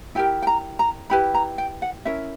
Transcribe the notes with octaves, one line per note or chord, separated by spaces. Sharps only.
E4 G4 A#4 G5
G5
A#5
A#5
E4 G4 B4 B5
A#5
G5
F#5
C#4 E4 A#4 E5